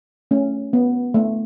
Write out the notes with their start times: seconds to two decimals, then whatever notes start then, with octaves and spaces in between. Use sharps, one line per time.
0.31 A3 C#4
0.73 B3
1.14 A3